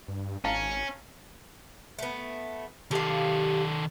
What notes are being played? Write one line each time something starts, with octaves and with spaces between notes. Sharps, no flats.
G2
G#1 C#4 F5 A5 A#5
A3 B3
D#3 G4 A4 F5